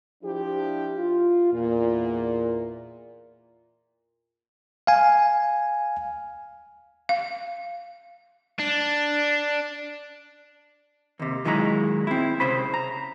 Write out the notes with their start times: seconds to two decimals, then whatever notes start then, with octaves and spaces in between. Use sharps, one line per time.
0.23 F3 D4 E4 G4
0.96 F4
1.52 E2 A#2
4.87 F5 G#5
7.09 F5
8.59 D4
11.19 D#2 C3
11.45 A#2 D#3 F#3 G#3 E4 A#5
12.07 C4 E4
12.40 C2 C#3 C5 B5
12.74 A#5